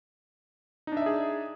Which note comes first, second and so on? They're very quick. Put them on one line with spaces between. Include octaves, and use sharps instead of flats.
D#4 D4 E5 D5 G#4